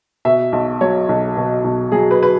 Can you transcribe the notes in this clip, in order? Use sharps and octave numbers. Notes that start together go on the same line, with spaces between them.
B2 E5
B1
F#3 C#5
B1
B2
B1
F#3 G#4
B4
B4